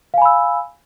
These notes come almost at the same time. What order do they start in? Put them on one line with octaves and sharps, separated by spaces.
F5 G#5 B5 E6